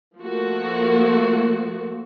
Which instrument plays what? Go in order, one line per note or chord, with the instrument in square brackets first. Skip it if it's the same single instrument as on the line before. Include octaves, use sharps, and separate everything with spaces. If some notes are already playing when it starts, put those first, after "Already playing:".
[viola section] F3 A3 A#3 F#4